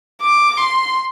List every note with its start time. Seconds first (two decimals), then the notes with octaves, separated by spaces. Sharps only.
0.21 D6
0.57 C6